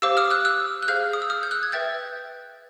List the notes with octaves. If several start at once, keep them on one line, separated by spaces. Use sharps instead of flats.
G4 C5 F5 D6 E6
D#6 F6
E6 F#6
E6 F#6
F#6
G#4 C5 F5 F6 G6
D#6
E6
D#6 F6
G6
E6 F#6
G#6
B4 E5 G5 G6 A6